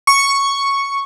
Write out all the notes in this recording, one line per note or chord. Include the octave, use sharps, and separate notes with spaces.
C#6